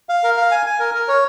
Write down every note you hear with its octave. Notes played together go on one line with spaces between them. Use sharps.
F5
A#4
F5
G#5
G#5
A#4
A#4
C#5